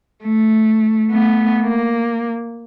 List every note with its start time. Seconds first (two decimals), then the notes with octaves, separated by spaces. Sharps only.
0.24 A3
1.11 A3 B3
1.63 A#3